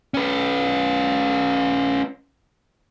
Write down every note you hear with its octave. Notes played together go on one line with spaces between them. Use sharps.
C#4 B4